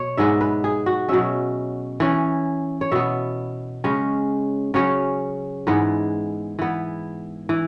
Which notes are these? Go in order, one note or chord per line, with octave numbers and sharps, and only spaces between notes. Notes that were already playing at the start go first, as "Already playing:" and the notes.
Already playing: B2 C#5
G#2 G#3 B3 E5
B4
G#4
F#4
B2 F#3 C#4 E5
E3 C#4
C#5
B2 B3 E5
C#3 G#3 C#4
C#3 F#3 C#4 C#5
G#2 E3 G#3 B3
E3 B3
E3